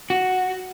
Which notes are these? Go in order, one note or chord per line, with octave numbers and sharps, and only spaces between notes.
F#4